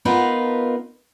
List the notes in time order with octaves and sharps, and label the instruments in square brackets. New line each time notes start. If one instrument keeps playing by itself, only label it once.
[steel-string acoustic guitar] B3 D#4 F4 A#4 B4